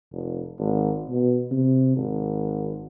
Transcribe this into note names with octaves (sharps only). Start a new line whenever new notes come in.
F1
G#1
B2
C3
G#1